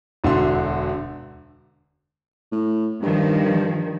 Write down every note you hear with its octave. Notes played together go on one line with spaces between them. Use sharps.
E1 D3 F#4 E5 C6
A2
G2 D#3 F3